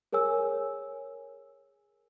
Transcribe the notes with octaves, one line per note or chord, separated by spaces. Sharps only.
G#4 A#4 C#5 G#5 E6